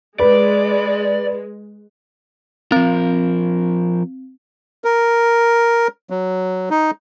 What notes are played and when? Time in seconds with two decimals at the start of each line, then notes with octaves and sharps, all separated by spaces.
0.20 G#3 B4 D5
2.72 F3 C4 A#4
4.84 A#4
6.10 F#3
6.70 D#4